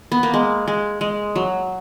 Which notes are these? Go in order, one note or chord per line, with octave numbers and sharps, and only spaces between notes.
B3
A#3
G#3
G#3
G#3
F#3